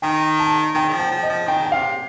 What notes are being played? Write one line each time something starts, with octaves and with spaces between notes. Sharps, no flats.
D#3 G5
A5
D#3 G5
D#3
F3
G5
F3
D#5
F3
D#3 G5
G5
C3 F5